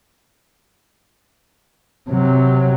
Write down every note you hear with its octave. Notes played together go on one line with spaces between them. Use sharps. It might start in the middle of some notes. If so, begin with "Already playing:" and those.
C3 F#3